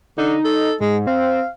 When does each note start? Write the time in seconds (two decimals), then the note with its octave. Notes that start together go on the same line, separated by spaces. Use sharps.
0.18 D3 D#4
0.45 A4
0.81 G#2 G#3
1.07 C4 F5